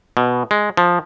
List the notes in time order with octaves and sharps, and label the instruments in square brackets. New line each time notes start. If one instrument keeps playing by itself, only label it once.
[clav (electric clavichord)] B2
G#3
F3